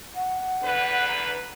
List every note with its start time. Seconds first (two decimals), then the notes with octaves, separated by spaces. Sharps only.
0.14 F#5
0.63 E2 D3 B4
1.08 A#5